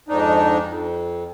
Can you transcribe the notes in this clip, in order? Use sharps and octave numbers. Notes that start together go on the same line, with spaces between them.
F2 G#2 D4 D#4
F2